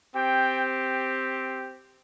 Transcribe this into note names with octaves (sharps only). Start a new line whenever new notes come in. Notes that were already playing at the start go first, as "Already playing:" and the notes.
C4 G4 G5